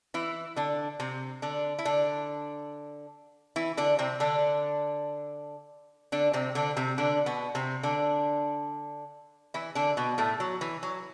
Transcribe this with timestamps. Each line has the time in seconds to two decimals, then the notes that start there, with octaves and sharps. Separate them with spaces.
0.14 E3 E4
0.56 D3 D4
1.00 C3 C4
1.42 D3 D4
1.79 E4
1.85 D3 D4
3.56 E3 E4
3.77 D3 D4
3.99 C3 C4
4.20 D3 D4
6.12 D3 D4
6.33 C3 C4
6.55 D3 D4
6.77 C3 C4
6.98 D3 D4
7.26 B2 B3
7.55 C3 C4
7.83 D3 D4
9.54 E3 E4
9.75 D3 D4
9.97 B2 B3
10.18 A2 A3
10.40 F#3
10.61 E3
10.83 F#3